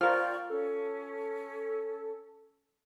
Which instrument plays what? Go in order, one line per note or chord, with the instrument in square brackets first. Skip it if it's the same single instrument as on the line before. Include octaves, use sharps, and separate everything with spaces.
[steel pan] F4 A#4 [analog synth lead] C5 [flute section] D5 G5 C#6 [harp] F6
[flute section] C#4 [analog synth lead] A4